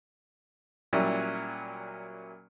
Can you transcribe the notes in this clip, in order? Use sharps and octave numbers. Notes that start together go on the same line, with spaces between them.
A#2 F#3 G3 C#4 E4